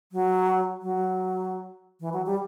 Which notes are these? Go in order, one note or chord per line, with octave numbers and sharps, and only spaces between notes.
F#3
F#3
E3
F#3
G3